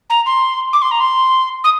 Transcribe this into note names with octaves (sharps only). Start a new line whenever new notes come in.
A#5
C6
D6
C6
A#5
C6
D#6